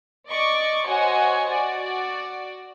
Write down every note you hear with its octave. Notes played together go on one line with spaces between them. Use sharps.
D5 D#5 C#6 D6
F#4 C5 C#5 D#5 F#5 G#5
F#4 D5